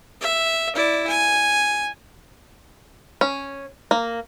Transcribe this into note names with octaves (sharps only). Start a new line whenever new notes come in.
E5
E4 D5
G#5
C#4
A#3